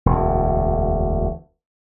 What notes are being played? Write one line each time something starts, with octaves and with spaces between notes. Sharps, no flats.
E1 D2